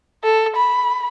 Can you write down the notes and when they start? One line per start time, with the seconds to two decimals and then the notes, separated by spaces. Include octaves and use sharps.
0.24 A4
0.56 B5